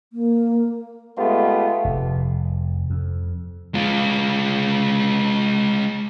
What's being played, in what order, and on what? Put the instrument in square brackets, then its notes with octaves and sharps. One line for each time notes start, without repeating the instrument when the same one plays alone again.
[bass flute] A#3
[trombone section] G#3 A3 B3 F4 G4
[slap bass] F1
F2
[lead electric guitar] G#3 F4